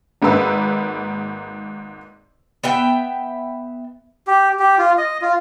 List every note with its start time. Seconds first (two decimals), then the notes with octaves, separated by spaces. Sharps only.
0.22 G#1 G#2 A#3 B4 E6
2.63 B3 E5 G5
4.27 G4
4.59 G4
4.78 F4
4.98 D#5
5.21 F4